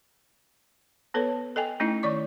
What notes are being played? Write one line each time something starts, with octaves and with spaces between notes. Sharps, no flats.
B3 A4 B4 C#5
A4 D#5 G5 G#5
A3 C#4 D#4 E4 D#5
D#3 D5 C#6 D6